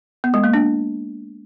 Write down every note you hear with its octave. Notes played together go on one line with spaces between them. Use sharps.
B3
G#3
A#3
D4